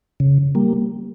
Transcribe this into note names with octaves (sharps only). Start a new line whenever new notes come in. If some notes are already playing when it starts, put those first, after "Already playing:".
C#3
G3 A#3